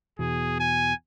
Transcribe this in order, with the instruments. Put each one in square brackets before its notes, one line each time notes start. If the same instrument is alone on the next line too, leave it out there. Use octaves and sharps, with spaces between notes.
[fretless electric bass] E2 B2 [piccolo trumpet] G#4
[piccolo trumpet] G#5